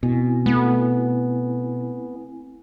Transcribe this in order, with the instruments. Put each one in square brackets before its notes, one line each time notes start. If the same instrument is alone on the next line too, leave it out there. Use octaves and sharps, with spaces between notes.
[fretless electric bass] B2 [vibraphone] C4 E4 G#5
[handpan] A3 [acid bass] B3